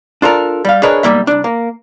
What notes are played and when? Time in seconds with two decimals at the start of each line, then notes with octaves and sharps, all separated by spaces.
0.22 D4 F4 A4 A#4
0.65 G3 F5
0.83 D4 G#4 A#4 B4 C#5 D#5
1.03 B1 B2 G3 A#3 E5
1.27 C2 D4
1.44 A#3